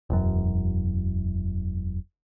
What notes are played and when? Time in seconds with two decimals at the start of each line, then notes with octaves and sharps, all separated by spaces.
0.10 E1 F#2